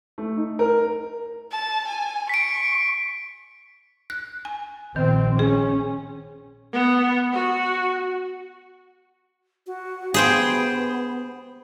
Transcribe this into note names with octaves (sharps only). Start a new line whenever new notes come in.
A3
D#4
A#4
A5
G#5
C#6 B6 D7
F#6
G#5
A#1 D#3 C4
C#4 G#4
B3
F#4
F#4
B3 G#4 C5 G5